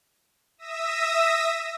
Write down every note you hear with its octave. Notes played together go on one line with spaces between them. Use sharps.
E5 D#6 E6 A#6